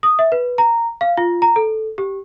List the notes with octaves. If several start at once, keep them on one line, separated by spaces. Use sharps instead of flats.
D#6
E5
B4
A#5
F5
F4
A#5
A4
G4